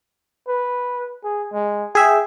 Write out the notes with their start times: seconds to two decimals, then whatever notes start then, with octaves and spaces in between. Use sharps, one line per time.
0.48 B4
1.24 G#4
1.53 G#3
1.95 G#4 E5 G5